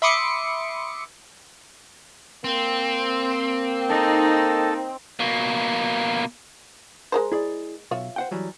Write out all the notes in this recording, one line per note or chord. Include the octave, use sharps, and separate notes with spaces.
E5 B5 C6 D6 D#6 C#7
A#3 C4
D#4 A4
B2 A#3
G#3 A#4 C5
E4 G#4 D5
B1 F4 C#5 E5
C5 F#5 G5
E3 F#3 G3